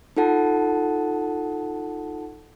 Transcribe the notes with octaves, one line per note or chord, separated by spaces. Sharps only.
D#4 F4 A4 F#5 A5